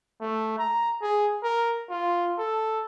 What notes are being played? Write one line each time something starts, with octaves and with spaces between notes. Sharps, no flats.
A3
A#5
G#4
A#4
F4
A4